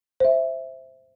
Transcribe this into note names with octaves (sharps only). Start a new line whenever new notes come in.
C5 E5